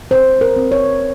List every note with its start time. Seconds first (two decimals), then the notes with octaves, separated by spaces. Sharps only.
0.11 C4 C5
0.41 A#4
0.56 C4
0.72 C#5